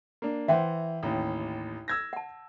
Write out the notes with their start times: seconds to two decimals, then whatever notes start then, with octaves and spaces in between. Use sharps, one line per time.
0.22 A#3 D4
0.48 E3 C5 E5 F#5 G5
1.03 A1 D#2
1.88 E6 G#6 A#6
2.13 F#5 A5